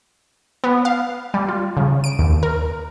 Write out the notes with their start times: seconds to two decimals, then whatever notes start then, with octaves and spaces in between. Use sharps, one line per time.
0.64 B3
0.85 F5
1.34 G3
1.48 F4
1.77 C#3
2.04 D7
2.19 D#2
2.43 A#4